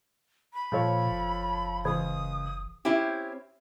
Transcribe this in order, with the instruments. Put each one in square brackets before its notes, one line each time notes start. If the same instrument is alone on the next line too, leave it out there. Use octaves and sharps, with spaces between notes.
[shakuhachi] B5
[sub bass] A#2 [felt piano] F3 A4 C#5
[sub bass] F#1
[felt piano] C#2 [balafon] E3 [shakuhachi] D#6
[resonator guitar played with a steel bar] C4 C#4 E4 G4